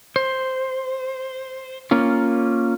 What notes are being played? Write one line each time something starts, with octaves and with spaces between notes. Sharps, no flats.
C5
A#3 C#4 F4